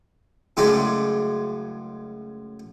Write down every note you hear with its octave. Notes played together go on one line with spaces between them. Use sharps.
F#2 A2 C#3 G#3 A3 D4